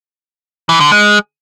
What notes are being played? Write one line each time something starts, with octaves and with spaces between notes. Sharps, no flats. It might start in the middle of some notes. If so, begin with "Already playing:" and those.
E3
D3
G#3